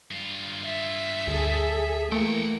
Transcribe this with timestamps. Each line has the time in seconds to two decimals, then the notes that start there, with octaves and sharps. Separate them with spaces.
0.11 G2 F4
0.64 E5
1.28 D2 G#4 A4
2.12 E3 A3 A#3 F#5 G5